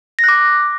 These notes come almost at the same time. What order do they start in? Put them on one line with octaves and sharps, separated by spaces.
A#6 F#6 D6